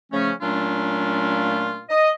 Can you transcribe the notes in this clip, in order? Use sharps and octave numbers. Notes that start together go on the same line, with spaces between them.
C#3 F3 A3 C#4
A#2 F#3 A3 C#4 D4 F4
D#5